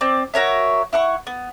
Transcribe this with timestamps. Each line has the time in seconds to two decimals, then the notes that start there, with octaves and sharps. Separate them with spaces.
0.01 C4 D5
0.34 F#4 A#4 C#5 E5
0.93 E4 F#5 C#6
1.27 B3